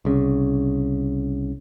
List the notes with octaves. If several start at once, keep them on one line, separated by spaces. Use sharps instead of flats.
C2 C#3